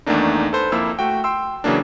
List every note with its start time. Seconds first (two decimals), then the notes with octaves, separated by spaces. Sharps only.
0.06 E2 D#3 A3 A#3 D4 D#4
0.53 A4 B4 C5
0.72 F2 A#3 E4 E6
0.99 A3 F#4 G5
1.24 G5 C6 E6
1.64 C#3 E3 F#3 A#3 D4